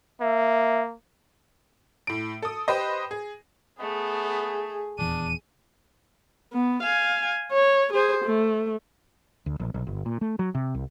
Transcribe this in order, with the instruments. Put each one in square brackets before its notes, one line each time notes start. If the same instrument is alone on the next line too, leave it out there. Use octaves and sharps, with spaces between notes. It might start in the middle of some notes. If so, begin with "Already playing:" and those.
[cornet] A#3 [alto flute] E5
[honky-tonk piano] A2 D7
A4 D#6
G4 B4 C5 D#5
G#4
[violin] A3 [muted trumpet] B3 [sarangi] G#4
[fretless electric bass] D#1 E2 [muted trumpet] D4 [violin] D#7
[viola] B3
F5 G#5
C#5
G#4 C5
A3
[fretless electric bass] D2
A#1
B1
G1
A#2
A3
F#3
C3
C2